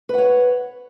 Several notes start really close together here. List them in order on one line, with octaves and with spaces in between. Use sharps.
B4 F#5 C#5